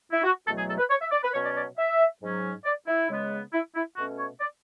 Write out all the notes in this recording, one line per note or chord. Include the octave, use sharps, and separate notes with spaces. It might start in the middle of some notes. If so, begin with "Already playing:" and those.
E4
F#4
E2 B2 F#3 A3 A4
G#4
A4
B4
C#5
E5
D5
B4
B2 F#3 C#4 C#5
D5
D5
E5
G#2 F#3 C#4
D5
E4
C#3 G#3 B3
E4
E4
B2 A3 C#4 F#4
C#5
D5